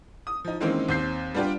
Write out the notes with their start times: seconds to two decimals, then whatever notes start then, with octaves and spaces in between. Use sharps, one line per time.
0.27 D#6
0.44 F3 D#4
0.61 D#3 E3 G#3 A#3 C4 C#4
0.88 D#2 C4 G6 C7
1.34 G3 B3 D4 F4 G4